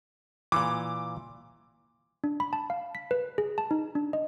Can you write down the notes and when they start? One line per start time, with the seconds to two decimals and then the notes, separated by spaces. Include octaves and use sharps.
0.52 A#2 E3 D6
2.24 D4
2.40 B5
2.53 A5
2.70 F5
2.95 B6
3.11 B4
3.38 G#4
3.58 A5
3.71 D#4
3.95 D4
4.13 D#5